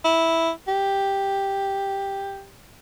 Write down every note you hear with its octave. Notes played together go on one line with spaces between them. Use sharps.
E4
G4